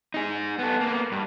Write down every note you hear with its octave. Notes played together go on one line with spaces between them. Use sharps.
D#4 G#4
B3 A4
A#3 B3
G2